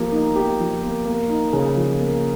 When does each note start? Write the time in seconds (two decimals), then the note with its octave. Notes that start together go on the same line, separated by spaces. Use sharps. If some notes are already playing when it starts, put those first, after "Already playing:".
Already playing: F3 A#3 G4
0.12 D#4
0.36 G4
0.59 F3
0.83 A#3
1.05 A#3
1.29 D#4
1.53 C#3
1.76 F3
1.99 A#3